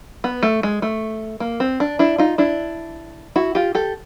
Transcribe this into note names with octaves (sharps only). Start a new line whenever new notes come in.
B3
A3
G#3
A3
A#3
C4
D4
D4 E4
D#4 F4
D4 E4
E4 F#4
F4 G4
G4 A4